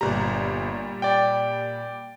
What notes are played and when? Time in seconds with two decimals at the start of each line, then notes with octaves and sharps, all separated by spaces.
0.01 G1 A#2 G3 A#5
1.02 D5 G5